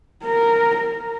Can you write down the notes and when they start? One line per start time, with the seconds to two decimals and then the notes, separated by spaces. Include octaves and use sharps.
0.24 A#4
0.79 A#4